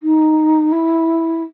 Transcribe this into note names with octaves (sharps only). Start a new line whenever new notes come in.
D#4
E4